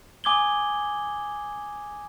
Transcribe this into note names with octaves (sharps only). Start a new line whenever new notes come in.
G#5 D6 D#6 G#6 F#7 G7